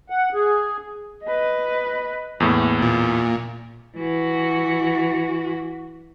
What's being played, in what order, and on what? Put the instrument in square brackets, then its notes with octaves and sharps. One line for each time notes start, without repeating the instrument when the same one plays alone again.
[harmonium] F#5
G#4
[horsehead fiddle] B4 D#5
[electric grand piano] E2 A2 [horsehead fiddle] A#3
[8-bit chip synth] A#2
[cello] E3 F#4